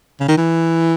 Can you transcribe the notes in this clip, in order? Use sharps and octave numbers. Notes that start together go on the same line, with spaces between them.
C#3
D#3
E3